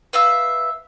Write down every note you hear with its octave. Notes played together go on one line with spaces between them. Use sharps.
B4 E5 F5 E6